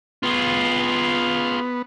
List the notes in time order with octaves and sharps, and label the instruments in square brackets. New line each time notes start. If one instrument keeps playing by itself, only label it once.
[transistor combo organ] B3 [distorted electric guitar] F4 G#4